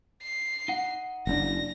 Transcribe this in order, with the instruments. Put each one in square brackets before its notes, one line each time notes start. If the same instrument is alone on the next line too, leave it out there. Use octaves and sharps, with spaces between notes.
[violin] C7
[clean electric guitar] D#4 F#5
[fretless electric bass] F#1 D4 [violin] A#6